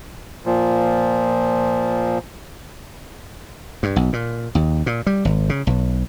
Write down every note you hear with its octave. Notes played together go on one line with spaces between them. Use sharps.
A#2 F3
G2
B1
A#2
D#2
A#2
G3
G#1
C#3
B1